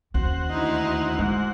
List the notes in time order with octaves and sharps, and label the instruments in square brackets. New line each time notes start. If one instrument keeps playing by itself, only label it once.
[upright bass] D#2 C#4 [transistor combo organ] F#4 C5 F#5
[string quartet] D2 D#4 E4
[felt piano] G#2 [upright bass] E4